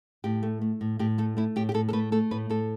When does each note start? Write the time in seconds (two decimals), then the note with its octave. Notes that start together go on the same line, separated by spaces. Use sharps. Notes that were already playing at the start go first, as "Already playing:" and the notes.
0.24 A2 G4
0.43 A3
0.61 A3
0.81 A2
0.99 A2 G4
1.18 A3 A4
1.37 A3 E4
1.56 A2 G4
1.69 G4
1.74 A2 A4
1.88 A4
1.93 A3 B4
2.12 A3 A4
2.31 A2 B4
2.50 A2 A4